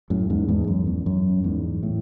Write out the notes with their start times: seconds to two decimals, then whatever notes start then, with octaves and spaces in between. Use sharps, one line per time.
0.10 F#2 A2
0.30 E2 G#2
0.48 E2 G#2
0.68 F#2
0.87 E2
1.06 F#2
1.44 E2 G#2
1.83 A2